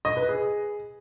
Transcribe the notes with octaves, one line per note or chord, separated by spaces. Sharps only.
D#5
B4
G#4